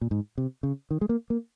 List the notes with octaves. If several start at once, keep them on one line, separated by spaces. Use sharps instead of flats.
A#2
G#2
C3
C#3
D#3
G#3
A#3
A#3